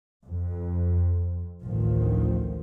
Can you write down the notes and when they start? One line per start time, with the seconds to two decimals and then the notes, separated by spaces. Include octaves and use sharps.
0.24 F2
1.63 A1 D2 D#3 F3